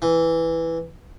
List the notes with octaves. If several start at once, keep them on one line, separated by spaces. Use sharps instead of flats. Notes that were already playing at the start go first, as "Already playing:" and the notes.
E3